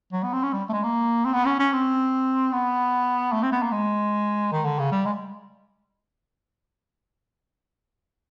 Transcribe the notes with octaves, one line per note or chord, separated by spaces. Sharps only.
F#3
B3
C4
C#4
G3
A3
G#3
A#3
C4
B3
C#4
C#4
C4
B3
A3
C4
B3
A#3
G#3
D#3
D3
C#3
G3
G#3